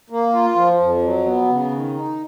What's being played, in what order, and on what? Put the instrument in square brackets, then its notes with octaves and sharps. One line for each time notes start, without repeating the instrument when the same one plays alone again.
[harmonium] A#3
F4
F3
F2
F#3
B3
C#3
D#3
D#4